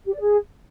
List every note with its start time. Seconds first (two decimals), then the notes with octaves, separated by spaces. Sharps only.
0.06 G4
0.13 D5
0.21 G#4